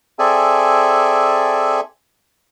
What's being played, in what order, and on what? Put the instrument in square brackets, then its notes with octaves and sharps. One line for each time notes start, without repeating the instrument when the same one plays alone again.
[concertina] C4 G#4 A4 D5 E5 G#5